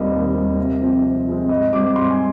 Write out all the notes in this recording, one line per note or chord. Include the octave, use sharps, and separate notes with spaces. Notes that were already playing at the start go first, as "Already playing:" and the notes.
Already playing: D#2 D#3 G3 C4 D#5
D#2
D#3 G3 C4
C3
F3 G#3 C4
C3
F3 G#3 C4
G#2 D#5
G3 C4 D6
D6
G#2 C6
G#5